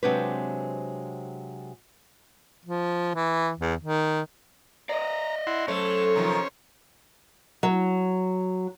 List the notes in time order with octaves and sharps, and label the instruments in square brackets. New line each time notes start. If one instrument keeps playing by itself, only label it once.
[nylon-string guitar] C3 F#3 G#3 C4 D4 B4
[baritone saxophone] F3
E3
E2
D#3
[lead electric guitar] D5 D#5 [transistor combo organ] A#5
[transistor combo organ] E4 F#5 C6
[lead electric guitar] F#3 [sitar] A3 [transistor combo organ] C#4 C5 C#5
[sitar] C3 D#3 F3
[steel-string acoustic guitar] F#3